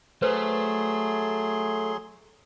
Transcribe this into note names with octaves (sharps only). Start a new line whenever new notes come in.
F#3 A3 G#4 B4 C5 C6